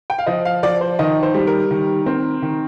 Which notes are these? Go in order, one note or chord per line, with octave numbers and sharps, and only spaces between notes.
G5
F5
F3 D#5
F5
F3 D5
C5
D#3 D#5
C5
G3
A#4
D#3
C4
D#3